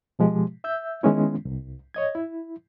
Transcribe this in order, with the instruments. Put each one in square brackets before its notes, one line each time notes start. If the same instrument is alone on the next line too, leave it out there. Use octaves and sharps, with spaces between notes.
[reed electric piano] B2 F3 G#3 G4
E5 E6 G6
D#3 G#3 B3 C#4 E4
C2
C#5 D#5 G#6
E4